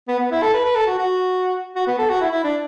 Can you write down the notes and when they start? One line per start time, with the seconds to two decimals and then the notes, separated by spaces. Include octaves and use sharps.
0.08 B3
0.19 B3
0.31 E4
0.42 A4
0.54 B4
0.65 B4
0.75 A4
0.87 F#4
0.98 F#4
1.76 F#4
1.87 B3
1.99 A4
2.10 F#4
2.21 E4
2.32 E4
2.44 D4